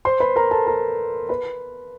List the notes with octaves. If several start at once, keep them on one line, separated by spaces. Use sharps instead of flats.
C5 C6
B4 B5
A#4 A#5
A4 A5
A#4 A#5
B4 B5